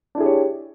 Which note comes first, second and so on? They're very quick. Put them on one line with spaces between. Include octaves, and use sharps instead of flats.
D4 E4 G#4 G4 C#5